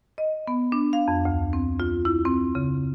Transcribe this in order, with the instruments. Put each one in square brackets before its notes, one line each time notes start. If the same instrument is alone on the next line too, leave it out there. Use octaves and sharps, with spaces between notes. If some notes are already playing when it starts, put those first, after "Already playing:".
[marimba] D#5
B3
D4
F5
F2
D2
C4
F4
E4
C4
C#3